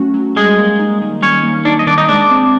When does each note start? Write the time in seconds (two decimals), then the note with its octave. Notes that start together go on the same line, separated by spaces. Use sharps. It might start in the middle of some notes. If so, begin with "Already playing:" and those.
Already playing: F#3 A3 C#4 F#4
0.14 F#3
0.36 G3 G#3 G#4
0.58 A#3
0.79 D#4
1.01 D#3
1.22 G3 C#4 C#5
1.44 A#3
1.65 D4 D#4 D5
1.79 D#5
1.87 D#3 D4 D5
1.98 D#4 D#5
2.08 G#3 D4 D5
2.30 C4